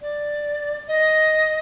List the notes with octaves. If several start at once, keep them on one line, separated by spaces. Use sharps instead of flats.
D5
D#5